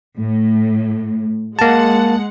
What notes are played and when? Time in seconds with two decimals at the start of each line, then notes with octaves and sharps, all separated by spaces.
0.18 A2
1.59 G#3 A#3 F#5 A5